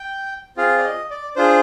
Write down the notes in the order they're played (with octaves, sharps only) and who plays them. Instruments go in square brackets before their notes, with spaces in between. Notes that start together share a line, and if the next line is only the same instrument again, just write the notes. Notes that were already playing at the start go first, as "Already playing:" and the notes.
Already playing: [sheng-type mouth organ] G5
C4 F4 G#4 F5
D5
D#5
D5
D4 F4 G#4 C5